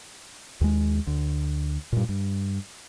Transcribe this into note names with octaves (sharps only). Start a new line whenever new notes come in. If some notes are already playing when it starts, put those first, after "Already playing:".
D#2 G#3
D2
G2 A#2
G2